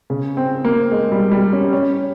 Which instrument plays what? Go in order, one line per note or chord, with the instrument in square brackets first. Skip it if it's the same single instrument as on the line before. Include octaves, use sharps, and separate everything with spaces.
[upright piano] C#3
C4
A#3
G#3
G3
G3
C#4
C#4